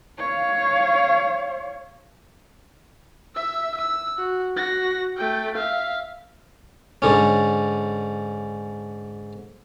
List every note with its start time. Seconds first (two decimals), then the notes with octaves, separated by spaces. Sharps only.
0.18 C#5 F5
3.35 E5 E6
3.78 E6
4.18 F#4
4.56 F#4 A#6
5.17 A3 G5
5.55 E5 F5
7.02 G#2 D3 C#4